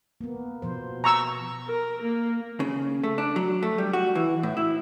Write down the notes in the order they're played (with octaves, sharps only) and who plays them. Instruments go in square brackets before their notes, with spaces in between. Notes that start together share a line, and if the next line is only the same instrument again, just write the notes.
[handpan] A#3 B3
B2 F3 C5
[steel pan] A#5 C#6 E6
[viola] A#4
A#3
[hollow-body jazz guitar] C#3
A3
D4
F#3
A3
G3
F#4
E3
A2
E4